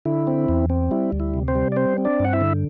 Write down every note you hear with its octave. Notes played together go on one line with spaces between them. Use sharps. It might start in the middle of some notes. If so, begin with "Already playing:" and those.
D3 E4
C4
E2
C4
G3 E4
D2
E4
C3
C4 C5
G3
D5
C4 C5
C4
D4 D5
G2 F#5
E4 E5
D3